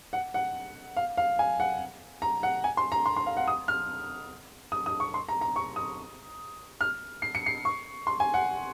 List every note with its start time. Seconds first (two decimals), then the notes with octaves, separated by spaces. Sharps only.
0.13 F#5
0.34 F#5
0.96 F5
1.17 F5
1.39 G#5
1.60 F#5
2.22 A#5
2.43 F#5
2.64 G#5
2.77 C6
2.92 A#5
3.06 C6
3.16 C6
3.26 F5
3.37 F#5
3.48 D#6
3.68 F6
4.72 D#6
4.86 D#6
5.00 C#6
5.14 C6
5.29 A#5
5.41 A#5
5.56 C#6
5.76 D#6
6.81 F6
7.22 C7
7.35 C#7
7.46 C7
7.65 C#6
8.07 C6
8.20 G#5
8.34 F#5